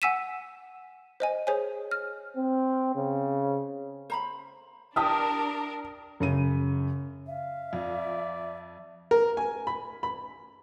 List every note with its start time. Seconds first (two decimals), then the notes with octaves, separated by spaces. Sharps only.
0.02 F#5 G#5 E6 B6 D#7 E7
1.20 C5 D#5 G#5
1.47 G#4 C5 C#5 G#5
1.91 F6
2.37 C4
2.96 C#3
4.10 C5 A#5 B5
4.96 D4 G4 A#4 E5 A5 D#6 F6
6.20 F#2 C#3 D#7
7.27 E5 F5
7.73 F2 D5
9.11 A#4
9.37 G#5
9.67 B5
10.03 B5